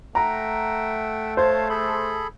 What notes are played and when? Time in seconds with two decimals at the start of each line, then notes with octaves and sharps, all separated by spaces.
0.15 A3 E5 F#5 G5 A#5
1.37 C5 C#5 F5 A5
1.69 G#4 A4 B5